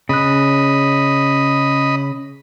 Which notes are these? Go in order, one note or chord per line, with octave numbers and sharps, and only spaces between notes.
C#3 D#5 B5 F#6